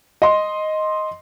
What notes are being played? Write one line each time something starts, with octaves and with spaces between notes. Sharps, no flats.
D#5 C6